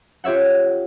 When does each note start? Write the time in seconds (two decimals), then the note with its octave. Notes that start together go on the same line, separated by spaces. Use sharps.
0.24 F4 G4 C#5 E5 F#5